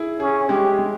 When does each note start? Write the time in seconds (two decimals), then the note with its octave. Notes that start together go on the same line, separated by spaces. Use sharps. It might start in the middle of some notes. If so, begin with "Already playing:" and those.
Already playing: E4 G#4
0.20 C#4 G#4
0.49 G#3 G4
0.78 G#3